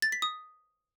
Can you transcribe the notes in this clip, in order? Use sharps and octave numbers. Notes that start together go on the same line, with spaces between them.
A6
B6
D#6